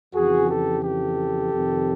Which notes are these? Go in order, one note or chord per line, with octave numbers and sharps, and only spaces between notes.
F2 C#3 E3 F#4 G#4
G4 A4
G4 A4
F2 C3 D#3